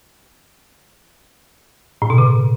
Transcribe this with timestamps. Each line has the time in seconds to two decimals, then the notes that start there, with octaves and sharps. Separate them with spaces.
2.02 A2
2.10 B2
2.18 C#3